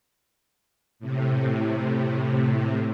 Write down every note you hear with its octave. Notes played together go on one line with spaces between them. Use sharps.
A2 C3